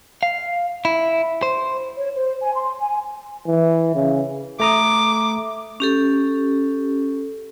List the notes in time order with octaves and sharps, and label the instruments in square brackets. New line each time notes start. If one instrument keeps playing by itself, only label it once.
[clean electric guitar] F5
E4
C5
[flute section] C#5
C5
G#5
C6
G#5
[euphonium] E3
C#3
[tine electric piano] A3 A#5 D#6 [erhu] D6
[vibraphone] C#4 G4 A4